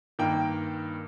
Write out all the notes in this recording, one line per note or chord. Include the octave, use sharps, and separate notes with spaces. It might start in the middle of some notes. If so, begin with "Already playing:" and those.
G2 D#3 A#3 G5